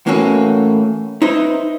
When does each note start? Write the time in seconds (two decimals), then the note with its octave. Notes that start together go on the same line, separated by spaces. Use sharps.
0.07 A2 E3 A#3 C#4 F#4
1.22 D#4 E4 B4 C5